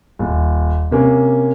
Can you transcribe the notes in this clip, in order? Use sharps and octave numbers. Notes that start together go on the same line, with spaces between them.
D#1
C3 A#3 C#4